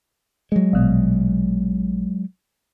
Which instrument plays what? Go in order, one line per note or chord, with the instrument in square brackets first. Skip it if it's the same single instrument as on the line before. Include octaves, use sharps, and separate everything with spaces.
[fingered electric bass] F#3 G#3
[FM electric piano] A#1 B2